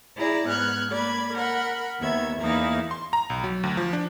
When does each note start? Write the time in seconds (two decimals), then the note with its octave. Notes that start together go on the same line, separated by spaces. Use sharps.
0.16 E4 G#4 D5 A#5
0.48 G#2 B3 F6 F#6 G#6
0.93 A#3 D5 B5 G#6
1.34 A#4 F#5 B5
2.00 D#2 D#3 B3 E5 G#6
2.40 E2 E3 A#3 D#4 E4 F5
2.91 C6
3.13 A#5
3.30 B1
3.44 F#3
3.63 D2
3.77 F3
3.93 D4